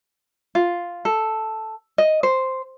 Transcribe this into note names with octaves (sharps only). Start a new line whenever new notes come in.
F4
A4
D#5
C5